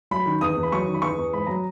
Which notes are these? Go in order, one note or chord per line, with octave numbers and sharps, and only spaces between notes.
F#3 B5
D#3
E2 D#6
E2
B5
F#3 C#6
D#3
B5
E2 C#6
E2
G#2 B5
F#3 A#5